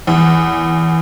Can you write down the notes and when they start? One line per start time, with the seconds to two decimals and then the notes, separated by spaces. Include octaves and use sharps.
0.07 E2